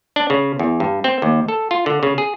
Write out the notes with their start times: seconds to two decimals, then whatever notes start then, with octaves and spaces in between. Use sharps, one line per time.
0.16 D4
0.30 C#3
0.59 E2
0.80 G2
1.04 C4
1.22 D#2
1.48 A4
1.71 F4
1.86 D3
2.03 C#3
2.18 G#4